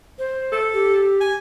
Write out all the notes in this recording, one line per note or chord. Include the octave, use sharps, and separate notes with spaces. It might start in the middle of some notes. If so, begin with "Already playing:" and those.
C5
A4
G4
G#5